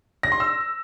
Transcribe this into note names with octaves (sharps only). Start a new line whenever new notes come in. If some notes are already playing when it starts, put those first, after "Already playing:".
A#6
C6
E6